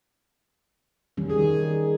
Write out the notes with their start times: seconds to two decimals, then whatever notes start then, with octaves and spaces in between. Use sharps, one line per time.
1.17 D#3 G3 C#4
1.30 D#3 G#4